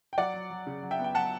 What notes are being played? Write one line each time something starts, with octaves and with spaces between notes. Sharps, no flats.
G5
F#3 D5 F#5
F#3
F#3
C#3
F#3
E5 G5
B3
G5
F#3 F#5 A5